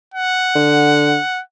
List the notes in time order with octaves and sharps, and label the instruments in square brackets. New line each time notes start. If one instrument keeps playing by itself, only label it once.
[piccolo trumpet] F#5
[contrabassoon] D3